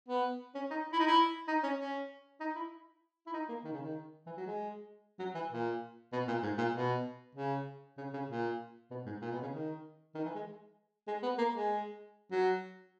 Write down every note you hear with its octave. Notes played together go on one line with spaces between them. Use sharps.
B3
C#4
D#4
E4
D#4
E4
D#4
C#4
C#4
D#4
E4
E4
D#4
A#3
D#3
C#3
D#3
E3
F#3
G#3
F#3
E3
A#2
B2
A#2
G#2
A#2
B2
C#3
C#3
C#3
A#2
B2
G#2
A#2
B2
C#3
D#3
D#3
E3
G#3
G#3
B3
A#3
G#3
F#3